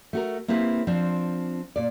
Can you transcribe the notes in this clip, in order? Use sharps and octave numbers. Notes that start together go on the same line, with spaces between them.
A3 F#4 A#4
A#3 C4 E4 G4 B4
F3 C4 D4
A#2 D5